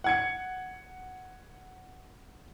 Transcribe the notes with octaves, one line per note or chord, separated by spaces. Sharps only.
F#5 G#6 C#7